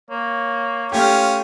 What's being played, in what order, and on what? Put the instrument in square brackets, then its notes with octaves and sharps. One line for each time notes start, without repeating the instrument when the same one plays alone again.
[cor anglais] A#3 [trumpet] C#5
[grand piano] A3 G4 [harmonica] C#4 F4